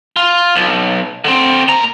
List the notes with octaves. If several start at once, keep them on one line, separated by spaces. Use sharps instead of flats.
F4
B1
D3 C4
A#2 A#5